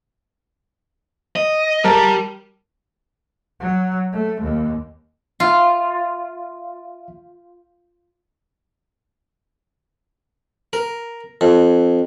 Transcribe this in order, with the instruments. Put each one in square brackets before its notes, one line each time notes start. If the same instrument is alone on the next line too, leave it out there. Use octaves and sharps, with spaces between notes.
[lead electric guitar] D#5
[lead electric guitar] G3 G4 [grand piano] A#4 A5
[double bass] F#3
A3
D#2
[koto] F4 [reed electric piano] E5 F5
[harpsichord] A#4
F2